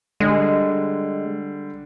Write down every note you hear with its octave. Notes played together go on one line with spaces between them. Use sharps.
D3 G3 G#3